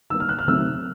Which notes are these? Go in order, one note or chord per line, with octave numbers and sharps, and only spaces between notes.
D#3 G3 A#3 E6
F6
F#6
F6
C3 D#3 F#3 A3 E6